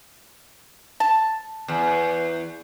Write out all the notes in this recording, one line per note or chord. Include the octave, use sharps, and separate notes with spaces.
A5
E2